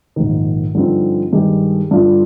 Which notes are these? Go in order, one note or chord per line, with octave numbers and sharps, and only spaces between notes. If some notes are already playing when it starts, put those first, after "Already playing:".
A#1 G#2 D#3
G2 D3 F3 C4 D#4
G2 D#3 G#3 D#4 G4
G2 D3 G3 D4 F4